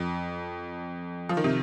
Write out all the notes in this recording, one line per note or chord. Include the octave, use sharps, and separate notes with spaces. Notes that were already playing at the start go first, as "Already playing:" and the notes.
Already playing: F2
F3
D#3
C3